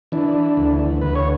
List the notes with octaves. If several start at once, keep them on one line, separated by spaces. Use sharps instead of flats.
E3 D4
D2
D2 B4
C#5